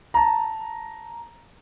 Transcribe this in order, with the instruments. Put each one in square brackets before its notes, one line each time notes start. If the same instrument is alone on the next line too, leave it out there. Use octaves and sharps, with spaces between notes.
[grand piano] A5 A#5